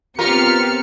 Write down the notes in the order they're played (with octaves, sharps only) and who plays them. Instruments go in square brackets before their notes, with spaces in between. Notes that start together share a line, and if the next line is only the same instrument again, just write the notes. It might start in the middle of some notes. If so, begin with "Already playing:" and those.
[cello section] B3 C4 G4 [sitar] F4 A#4 [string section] F6 A6 C#7